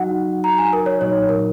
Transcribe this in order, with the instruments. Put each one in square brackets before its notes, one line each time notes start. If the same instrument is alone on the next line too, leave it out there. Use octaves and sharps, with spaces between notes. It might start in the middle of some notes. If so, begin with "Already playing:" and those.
Already playing: [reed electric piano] F#3 D#4 F#4 [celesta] F#5
[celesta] A#5
G#5
A#4
C#5
[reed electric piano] A#2 F#3 D#4 [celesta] C#5
[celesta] A#4